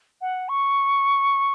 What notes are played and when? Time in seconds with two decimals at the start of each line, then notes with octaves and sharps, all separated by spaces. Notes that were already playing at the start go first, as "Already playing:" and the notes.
0.21 F#5
0.48 C#6